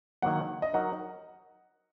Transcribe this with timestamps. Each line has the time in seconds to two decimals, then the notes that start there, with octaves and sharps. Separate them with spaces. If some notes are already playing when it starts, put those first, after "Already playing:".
0.22 D#3 F#3 A#3 F#5
0.62 D#5
0.74 F#3 D#4 A#4 F#5